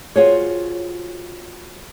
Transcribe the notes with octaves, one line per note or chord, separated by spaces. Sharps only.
F4 F#4 G#4 C5 C#5